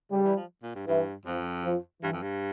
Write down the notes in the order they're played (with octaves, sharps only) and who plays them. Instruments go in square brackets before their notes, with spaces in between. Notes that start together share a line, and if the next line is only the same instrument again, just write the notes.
[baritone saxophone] C#3 [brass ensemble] G3
[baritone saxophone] E3
F3
A#2
G2
[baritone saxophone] G2 [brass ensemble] E3
[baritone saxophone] F2 [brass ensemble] F3
[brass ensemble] F3
[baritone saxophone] G2 [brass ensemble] E3
[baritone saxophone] F2
G2